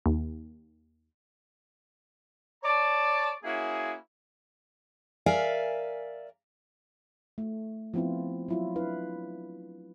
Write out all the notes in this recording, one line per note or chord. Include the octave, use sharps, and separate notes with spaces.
D#2
C#5 D5 A5
A#3 C#4 E4 F#4 G#4
A#4 D5 E5 F5 G#5
A3
F3 B3 C4 E4 F4
F#3 E4 F4
D4 E4 B4 F5